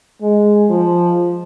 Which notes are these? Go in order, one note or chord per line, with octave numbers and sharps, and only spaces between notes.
G#3
F3